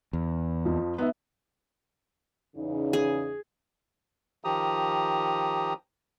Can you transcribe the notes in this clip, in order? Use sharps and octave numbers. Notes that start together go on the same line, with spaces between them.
E2
F2 F3
B3 D#4 E5
E2 C#3 D#4
G#4
D#3 F3 G4 A#5 D#6